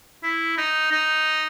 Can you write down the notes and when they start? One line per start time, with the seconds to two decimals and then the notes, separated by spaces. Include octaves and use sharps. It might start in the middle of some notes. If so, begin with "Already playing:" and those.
0.23 E4
0.58 D#4
0.92 D#4